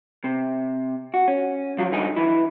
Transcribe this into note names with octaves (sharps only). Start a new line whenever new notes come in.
C3
F#4
C#4
F3 F#3
C#2 G2 D3 D#4 G#5
E3 E4